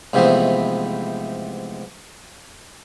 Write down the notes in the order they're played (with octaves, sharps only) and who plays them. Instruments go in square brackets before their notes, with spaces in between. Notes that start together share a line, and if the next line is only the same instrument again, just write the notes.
[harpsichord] G#2 C3 E3 F3 A3 B3